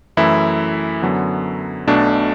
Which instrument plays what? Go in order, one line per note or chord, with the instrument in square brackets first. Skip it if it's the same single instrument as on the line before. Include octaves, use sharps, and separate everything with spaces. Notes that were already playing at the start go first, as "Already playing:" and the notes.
[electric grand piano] F#2 E3 A3 E4
F#2 D3 F#3 B3
B1 B2 A3 D4